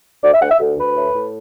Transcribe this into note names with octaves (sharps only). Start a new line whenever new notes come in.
D2 D5
E5
D2 F#5
E5
D2
D2 B4
A2
A2